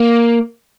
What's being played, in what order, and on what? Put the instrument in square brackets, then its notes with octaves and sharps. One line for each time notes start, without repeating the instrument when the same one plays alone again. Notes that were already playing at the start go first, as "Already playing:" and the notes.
Already playing: [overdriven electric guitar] A#3